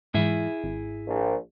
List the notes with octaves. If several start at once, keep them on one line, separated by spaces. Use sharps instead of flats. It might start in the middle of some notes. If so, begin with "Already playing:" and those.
G#2 E3 E4 G#4 E5
G#1
A#1